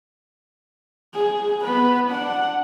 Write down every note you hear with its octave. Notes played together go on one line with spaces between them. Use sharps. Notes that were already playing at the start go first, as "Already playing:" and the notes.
G#4
B3 B4
D4 F#5